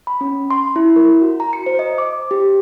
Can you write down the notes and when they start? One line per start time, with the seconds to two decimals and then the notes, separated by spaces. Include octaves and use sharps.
0.07 B5
0.21 C#4
0.50 C6
0.76 E4
0.96 A#4
1.22 F#4
1.40 A#5
1.53 C#7
1.66 C5
1.79 D#5
1.98 D6
2.31 G4